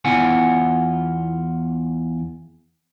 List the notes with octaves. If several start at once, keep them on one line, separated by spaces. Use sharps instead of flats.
E2 B3 E4 F4 F#5 G#5